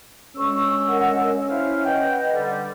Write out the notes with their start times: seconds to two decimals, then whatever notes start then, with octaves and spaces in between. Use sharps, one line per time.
0.36 D2 G#3 C#4 C#6 E6
0.86 A#4 D#5 F#5
1.50 E4 C5 E5 F5
1.85 B4 D#5 F#5 G5
2.33 D3 G3